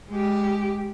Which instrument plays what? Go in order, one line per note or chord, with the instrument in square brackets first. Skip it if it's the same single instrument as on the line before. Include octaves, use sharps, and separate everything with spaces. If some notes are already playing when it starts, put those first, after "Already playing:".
[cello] G#3 G4